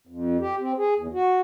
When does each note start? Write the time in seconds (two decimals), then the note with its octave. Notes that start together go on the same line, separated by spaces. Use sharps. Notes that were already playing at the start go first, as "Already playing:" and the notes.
0.07 F2
0.40 G4
0.59 C4
0.78 G#4
0.97 E2
1.13 F#4